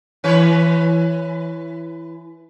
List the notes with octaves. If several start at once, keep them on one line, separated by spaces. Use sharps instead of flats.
E3 B4 C#5